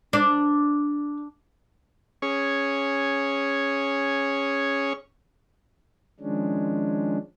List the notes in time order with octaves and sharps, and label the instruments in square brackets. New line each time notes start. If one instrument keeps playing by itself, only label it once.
[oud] D4
[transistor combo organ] C#4 G#4 C#5
[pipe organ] D#3 F3 G#3 C#4 D4